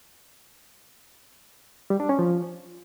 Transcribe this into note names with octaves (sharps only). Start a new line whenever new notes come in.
G3
D4
C#4
F3